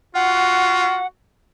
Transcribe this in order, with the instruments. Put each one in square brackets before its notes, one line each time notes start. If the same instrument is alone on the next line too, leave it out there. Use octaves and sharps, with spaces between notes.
[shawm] F4 [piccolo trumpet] F#4 [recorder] F#5